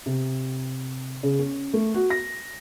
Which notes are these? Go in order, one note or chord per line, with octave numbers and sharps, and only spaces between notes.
C3
C#3
C#4
A3
F#4
A#6